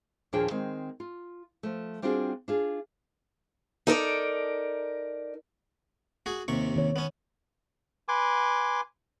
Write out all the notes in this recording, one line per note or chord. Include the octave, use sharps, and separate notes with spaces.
D#2 A#2 F3 D4 G#4 G5
D#3 G#3 C4
F4
F3 A3
G3 C4 D4 F4 F#4 G#4
D4 F4 G#4
D#4 A4 A#4 D5
F#4 G#4
D#2 C3 C#6
D#3 C#5
B3 C#4
B4 G#5 C6 D6